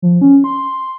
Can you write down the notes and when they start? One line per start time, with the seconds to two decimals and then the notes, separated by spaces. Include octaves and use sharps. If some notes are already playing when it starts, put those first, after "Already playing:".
0.02 F3
0.21 C#4
0.44 C6